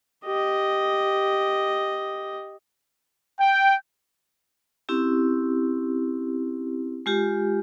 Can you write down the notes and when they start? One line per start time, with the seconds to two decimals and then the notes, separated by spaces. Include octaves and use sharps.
0.25 G4 D#5
3.39 G5
4.89 C4 C#4 E4 G4
7.06 G#3 F4 G4